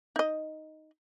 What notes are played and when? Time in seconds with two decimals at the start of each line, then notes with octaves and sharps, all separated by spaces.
0.16 D#4 D#5